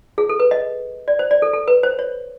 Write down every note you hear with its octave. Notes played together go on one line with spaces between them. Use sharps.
G#4
A4
B4
D#5
D5
C5
D5
A4
A4
B4
C5
C#5